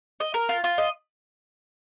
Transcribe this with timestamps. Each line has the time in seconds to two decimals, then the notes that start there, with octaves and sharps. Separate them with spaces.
0.20 D#5
0.34 A#4
0.49 F4
0.64 F4
0.78 D#5